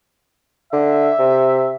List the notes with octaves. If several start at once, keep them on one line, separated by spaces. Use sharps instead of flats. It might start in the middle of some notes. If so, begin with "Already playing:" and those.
D3 E5
C3